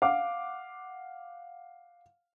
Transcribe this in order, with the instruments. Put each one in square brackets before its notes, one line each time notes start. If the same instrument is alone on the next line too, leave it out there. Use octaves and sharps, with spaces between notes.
[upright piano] F5 F#5 D6